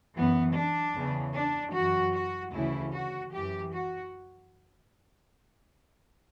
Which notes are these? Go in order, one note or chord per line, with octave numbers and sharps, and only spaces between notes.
F#2 E3 B3
D4
E2 C#3 E3
D4
F#2 E3 F#4
F#4
D2 C#3 E3 E4
F#4
F#2 E3 G4
F#4